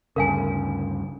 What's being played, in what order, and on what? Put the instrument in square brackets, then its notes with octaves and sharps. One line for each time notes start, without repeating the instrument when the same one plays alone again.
[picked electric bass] D2 G2 C#3 [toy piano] A#4 F5 G#5